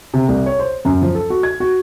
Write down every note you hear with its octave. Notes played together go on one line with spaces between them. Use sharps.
C3
C2
C#5
C5
F#2
F3
A4
F#4
G#6
F#4